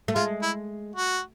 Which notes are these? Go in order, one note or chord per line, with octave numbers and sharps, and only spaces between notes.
A3
G#3 F4
E4
F#4